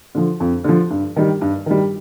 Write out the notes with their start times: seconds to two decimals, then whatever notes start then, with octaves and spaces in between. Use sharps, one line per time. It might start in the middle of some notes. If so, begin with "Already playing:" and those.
0.15 D3 F3
0.40 F2
0.64 D3 F3
0.90 G2
1.16 D#3 G3
1.41 G2
1.66 D#3 G3